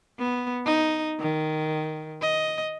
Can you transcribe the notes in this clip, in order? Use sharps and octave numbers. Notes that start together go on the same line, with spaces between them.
B3
D#4
D#3
D#5